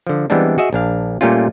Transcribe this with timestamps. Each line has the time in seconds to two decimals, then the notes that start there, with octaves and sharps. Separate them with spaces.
0.07 D3 F3
0.30 E3 G3 G#3 B3 C4 D4
0.58 F#4 G#4 D#5 E5
0.73 A#1 D4 F5
1.21 A#2 G3 A3 C#4 F4